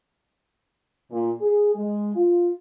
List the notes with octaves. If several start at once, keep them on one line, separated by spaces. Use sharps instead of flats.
A#2
G#4
G#3
F4